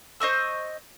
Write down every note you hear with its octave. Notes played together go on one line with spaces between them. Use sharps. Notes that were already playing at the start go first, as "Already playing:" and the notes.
C5 D#5 C#6 E6